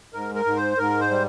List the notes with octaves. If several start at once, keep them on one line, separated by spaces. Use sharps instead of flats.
G#2 A#4
A#4
G#2
C5
G#2 A#4
C5
G3